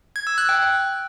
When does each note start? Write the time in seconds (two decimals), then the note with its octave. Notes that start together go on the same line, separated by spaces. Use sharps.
0.16 G#6
0.27 E6
0.38 F#6
0.49 G5